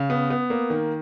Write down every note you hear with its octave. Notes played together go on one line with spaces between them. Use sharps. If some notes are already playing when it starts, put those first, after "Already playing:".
Already playing: C#3
B3
B3
A#3
D#3